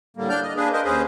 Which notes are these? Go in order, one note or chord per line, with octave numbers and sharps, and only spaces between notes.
A2 D3 G3 A#3
D4 D5 F6 G6
D#5
A#3 D4 G#4 B4
A#4 C5 D#5
D#2 C#4 G#4 B4 C5